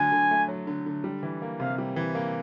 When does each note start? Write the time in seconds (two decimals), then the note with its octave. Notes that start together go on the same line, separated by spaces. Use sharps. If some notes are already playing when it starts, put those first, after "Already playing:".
Already playing: D3 F#3 A3 G#5
0.12 D3
0.31 A3
0.48 F#3
0.67 D3
0.86 D3
1.04 G3
1.23 E3
1.42 A#3
1.59 C3 F5
1.78 G3
1.96 E3
2.15 A#3